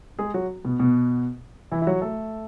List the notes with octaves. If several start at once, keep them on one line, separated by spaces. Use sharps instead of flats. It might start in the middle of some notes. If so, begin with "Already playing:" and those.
G#3 G#4
F#3 F#4
B2 B3
B2 B3
E3 E4
E4
F#3 F#4
A3 A4